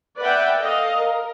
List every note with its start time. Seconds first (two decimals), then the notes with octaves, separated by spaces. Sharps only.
0.18 B4 D5 E5 F#5 G5
0.60 A4 D#5 F5
0.96 A#4